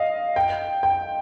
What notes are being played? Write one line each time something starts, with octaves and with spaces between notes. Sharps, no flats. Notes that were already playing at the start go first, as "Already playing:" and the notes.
Already playing: D#5 F5
G5
G5